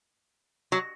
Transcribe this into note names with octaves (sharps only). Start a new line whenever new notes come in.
F#3